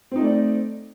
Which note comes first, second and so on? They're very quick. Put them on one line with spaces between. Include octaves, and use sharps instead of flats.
C4 D#4 A3 D5